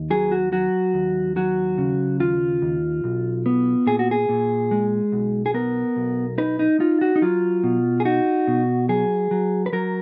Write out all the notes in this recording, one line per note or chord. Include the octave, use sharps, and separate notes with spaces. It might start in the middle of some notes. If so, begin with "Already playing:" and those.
Already playing: D#2
F#3 G#4
F#4
F#3 F#4
D#2
F#3 F#4
C#3
D#2 F4
D#2
B1
B3
A#2 G#4
F#4
G#4
A#2
G#3
B1
G#4
B3 A#4
B1
D#4 B4
D#4
D#4 F4
F#4
D#4
F#3 F4
B2
G#4
D#4 F#4
B2
F#3 G#4
F#3
B4
F#3 A#4